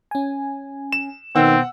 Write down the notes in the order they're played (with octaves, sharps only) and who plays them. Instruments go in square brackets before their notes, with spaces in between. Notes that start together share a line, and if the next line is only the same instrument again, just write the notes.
[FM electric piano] C#4 G#5
[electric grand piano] E7
[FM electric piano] B2 B3 [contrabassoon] D#3 [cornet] C4 [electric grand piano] F#5 E6